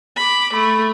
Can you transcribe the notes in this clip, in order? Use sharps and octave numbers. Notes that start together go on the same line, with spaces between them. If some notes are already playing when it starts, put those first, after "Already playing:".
B5 D6
A3 B5